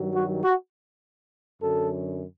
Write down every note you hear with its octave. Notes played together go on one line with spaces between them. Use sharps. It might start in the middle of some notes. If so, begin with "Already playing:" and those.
Already playing: G2 D#3 F#3
F#4
F#4
F#2 D3 F#3 A4